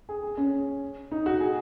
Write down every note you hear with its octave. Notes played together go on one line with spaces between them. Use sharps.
G#4
G#4
C#4
D#4
F#4
G#4